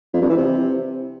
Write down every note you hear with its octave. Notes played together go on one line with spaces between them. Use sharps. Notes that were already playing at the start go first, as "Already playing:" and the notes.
F2
G2
E3
C3